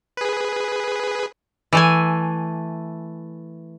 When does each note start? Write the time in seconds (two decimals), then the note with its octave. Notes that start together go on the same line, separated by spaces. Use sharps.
0.17 G#4 B4
1.73 E3 A3 G#5